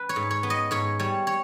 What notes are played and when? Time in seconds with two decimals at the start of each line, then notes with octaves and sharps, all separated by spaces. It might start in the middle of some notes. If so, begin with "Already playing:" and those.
Already playing: B4
0.09 C#5
0.16 G#2
0.31 C#5
0.43 B3
0.50 D#5
0.71 G#2 C#5
0.99 G3 C#5
1.27 C#5